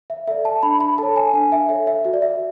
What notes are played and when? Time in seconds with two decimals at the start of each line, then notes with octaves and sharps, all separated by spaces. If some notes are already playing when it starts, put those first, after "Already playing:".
0.10 E5
0.27 A4 D5 E5
0.45 A5
0.63 D4 B5
0.80 B5
0.98 A4 C#5 A5
1.16 G#5
1.34 D4 G#5
1.52 E5
1.69 A4 C#5 E5
1.87 E5
2.05 F#4 E5
2.14 D5
2.22 E5